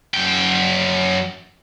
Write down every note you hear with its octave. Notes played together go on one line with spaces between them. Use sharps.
F#2 G5